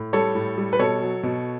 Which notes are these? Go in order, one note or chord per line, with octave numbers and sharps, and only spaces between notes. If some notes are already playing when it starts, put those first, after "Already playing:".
Already playing: A2
G3 A4 C#5
A2
G3
B4
B2 A4 C#5
F#3
B2